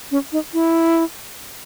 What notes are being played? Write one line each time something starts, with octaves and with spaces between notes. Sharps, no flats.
C#4
D#4
E4